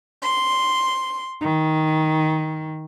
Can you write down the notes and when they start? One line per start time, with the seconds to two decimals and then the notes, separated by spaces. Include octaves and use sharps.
0.22 C6
1.42 D#3